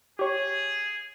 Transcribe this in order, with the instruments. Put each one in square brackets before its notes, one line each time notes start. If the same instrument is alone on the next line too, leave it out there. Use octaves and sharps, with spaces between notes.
[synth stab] G4 C#5 [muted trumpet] G#4